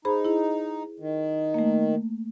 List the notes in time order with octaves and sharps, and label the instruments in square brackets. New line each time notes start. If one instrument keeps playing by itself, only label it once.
[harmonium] D#4 [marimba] G#4 C5 B5
[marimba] E4 G#4
[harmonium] D#3
[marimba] A3 A#3